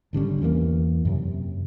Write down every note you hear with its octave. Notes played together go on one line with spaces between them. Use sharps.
G#1 D3 G3 C#4
E2 E3 F#3 A#3
F#2 C3